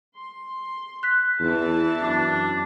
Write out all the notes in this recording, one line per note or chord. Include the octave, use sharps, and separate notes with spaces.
C6
F#6 B6
E2 E3 E4 A5
F#2 D4